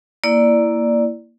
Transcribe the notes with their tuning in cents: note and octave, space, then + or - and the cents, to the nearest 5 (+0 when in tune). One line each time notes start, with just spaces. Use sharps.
A#3 +0 E4 +0 D5 +0